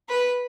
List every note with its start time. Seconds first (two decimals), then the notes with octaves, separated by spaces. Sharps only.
0.09 B4